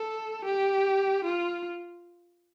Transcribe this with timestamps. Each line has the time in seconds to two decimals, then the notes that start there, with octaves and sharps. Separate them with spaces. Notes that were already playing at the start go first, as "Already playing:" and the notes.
Already playing: A4
0.45 G4
1.25 F4